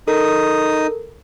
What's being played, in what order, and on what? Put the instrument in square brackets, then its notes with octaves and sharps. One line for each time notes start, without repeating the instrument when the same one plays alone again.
[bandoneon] D#4 D#6 [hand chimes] A4 A#4